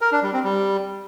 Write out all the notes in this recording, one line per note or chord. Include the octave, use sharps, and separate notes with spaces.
A#4
D4
G3
C4
G3